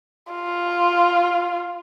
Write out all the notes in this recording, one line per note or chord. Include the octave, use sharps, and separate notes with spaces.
F4